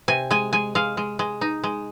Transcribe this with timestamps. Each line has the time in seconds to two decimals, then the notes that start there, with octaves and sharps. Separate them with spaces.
0.08 C3 G#5
0.31 G#3 G#5
0.53 G#3 G#5
0.75 G#3 F5
0.97 G#3
1.19 G#3
1.41 D#4
1.64 G#3